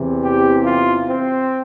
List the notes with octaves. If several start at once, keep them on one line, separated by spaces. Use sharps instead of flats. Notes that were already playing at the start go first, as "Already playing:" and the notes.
Already playing: E2 C3 E3
G4
F4
C4